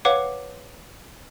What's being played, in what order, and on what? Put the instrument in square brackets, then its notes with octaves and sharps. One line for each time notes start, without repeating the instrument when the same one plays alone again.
[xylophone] B4 C#5 F5 F#5 D6